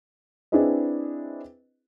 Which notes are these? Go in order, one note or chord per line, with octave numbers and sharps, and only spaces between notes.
C4 D4 E4 G#4 B4 D#5